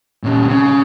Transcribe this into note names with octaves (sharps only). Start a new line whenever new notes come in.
A#2 C#4
C#3